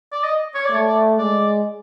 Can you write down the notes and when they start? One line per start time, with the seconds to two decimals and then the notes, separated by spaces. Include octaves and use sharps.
0.12 D5
0.24 D#5
0.55 C#5
0.65 D5
0.71 A3 C#5
0.87 D5
1.18 G#3 D5